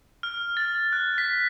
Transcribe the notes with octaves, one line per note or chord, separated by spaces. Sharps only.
F6
A6
F#6
B6